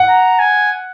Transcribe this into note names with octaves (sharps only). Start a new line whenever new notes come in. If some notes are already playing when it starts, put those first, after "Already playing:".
Already playing: F#5
A#5
G#5